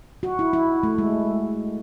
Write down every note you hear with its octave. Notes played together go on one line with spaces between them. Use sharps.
F#4
E4
E4
A3
G#3